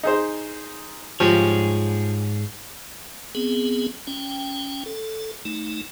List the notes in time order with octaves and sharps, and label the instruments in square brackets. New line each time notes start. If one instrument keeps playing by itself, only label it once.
[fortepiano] D#4 G#4 C5
[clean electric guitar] G#2 G#4 C#5 [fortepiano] F3 G3
[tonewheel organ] B3 C4 G#4
C#4 G5
A4
A3 D#4